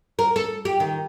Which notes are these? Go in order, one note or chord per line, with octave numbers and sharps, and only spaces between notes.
A#4
A4
G4
D#3